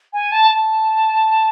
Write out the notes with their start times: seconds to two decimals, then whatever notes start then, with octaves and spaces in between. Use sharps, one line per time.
0.13 G#5
0.32 A5
0.51 A5